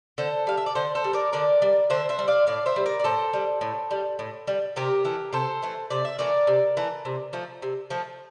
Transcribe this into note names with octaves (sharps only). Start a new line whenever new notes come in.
D3 A4 C5
G3 F5
E5
D5
D3 A4 C5
A4 C5
G3
A#4 D5
D3 A#4 D5
G3
D3 C5 E5
C5 E5
G3
D5 F5
A2 D5 F5
C5 E5
G3
A#4 D5
D5
A2 A4 C5
G3
A2
G3
A2
G3
C3 G4 A#4
E3 A3
C3 A4 C5
E3 A3
C3 D5
E5
E3 A3 A#4 D5
C3
E3 A3
C3
F3 A3
C3
F3 A3